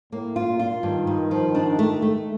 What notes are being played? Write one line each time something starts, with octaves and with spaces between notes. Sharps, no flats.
A2 A#3
F4
A#2
F4
G2 D#3
G2
F3
D4
A3
A3